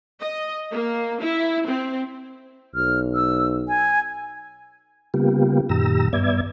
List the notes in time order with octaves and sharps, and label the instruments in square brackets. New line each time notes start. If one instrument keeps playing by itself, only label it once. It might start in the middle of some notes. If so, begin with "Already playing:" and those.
[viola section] D#5
A#3
E4
C4
[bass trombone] B1 [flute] F6
[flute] E6
G#5
[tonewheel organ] C#3 G3 A#3 B3 F4 G4
F#2 A#2 D#3 G4 A#5 E6
G2 B3 D5 E5 G#6